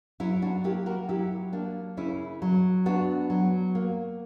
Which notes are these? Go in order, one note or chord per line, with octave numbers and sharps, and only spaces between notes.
F#3 C#4 E4
D4 F#4
A#3 E4 G4
F#4 A#4
F#3 E4 G4
A#3 D4
C#3 C#4 E4
F#3
B3 D4 F#4
F#3
A#3